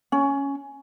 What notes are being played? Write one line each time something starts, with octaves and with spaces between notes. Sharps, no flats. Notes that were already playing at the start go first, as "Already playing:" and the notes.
C#4